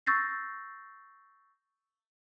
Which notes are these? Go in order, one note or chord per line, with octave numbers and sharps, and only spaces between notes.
C#6 E6 G6 A6 A#6 C7